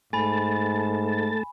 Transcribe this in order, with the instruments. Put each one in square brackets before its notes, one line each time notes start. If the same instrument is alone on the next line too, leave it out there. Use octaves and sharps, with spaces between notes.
[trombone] G#2 [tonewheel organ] A3 A5 [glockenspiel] G#5 B5